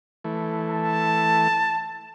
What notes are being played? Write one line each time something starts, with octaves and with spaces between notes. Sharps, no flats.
E3 A3
A5